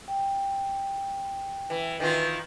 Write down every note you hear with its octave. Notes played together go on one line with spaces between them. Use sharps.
G5
E3
D#3 E3 F4